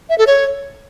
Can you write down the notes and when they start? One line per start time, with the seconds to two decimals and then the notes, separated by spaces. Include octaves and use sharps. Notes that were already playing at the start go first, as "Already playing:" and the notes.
0.09 E5
0.18 A4
0.27 C#5